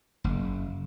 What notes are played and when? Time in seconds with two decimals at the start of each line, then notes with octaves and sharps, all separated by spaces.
0.24 F#1